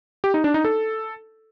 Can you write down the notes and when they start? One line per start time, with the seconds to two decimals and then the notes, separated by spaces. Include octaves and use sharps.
0.24 G4
0.34 D#4
0.44 D4
0.54 D#4
0.65 A4